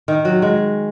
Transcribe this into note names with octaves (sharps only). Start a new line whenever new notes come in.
D#3
F#3
G#3